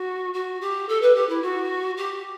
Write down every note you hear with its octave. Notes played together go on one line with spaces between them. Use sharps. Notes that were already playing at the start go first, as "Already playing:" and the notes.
Already playing: F#4
F#4
G4
A4
B4
G4
E4
F#4
G4